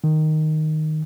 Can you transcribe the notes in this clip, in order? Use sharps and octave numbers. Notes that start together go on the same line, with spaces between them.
D#3